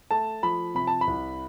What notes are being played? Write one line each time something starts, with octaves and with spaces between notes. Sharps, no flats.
A3 A5
F3 B5
C3 B5
A5
B5
C2